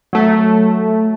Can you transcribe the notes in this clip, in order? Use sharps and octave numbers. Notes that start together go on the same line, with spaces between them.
F#3 A3